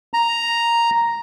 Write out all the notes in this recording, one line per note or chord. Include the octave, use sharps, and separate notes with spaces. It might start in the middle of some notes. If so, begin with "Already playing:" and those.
A#5